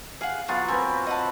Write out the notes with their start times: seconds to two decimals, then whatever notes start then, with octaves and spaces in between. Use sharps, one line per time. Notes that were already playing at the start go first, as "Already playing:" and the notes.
0.21 G#4 F5 F#5
0.48 F#3 B3 F4 G#4 F5 F#5
0.68 C4 A#4 B4 G#5
1.06 D#5 F#5 A5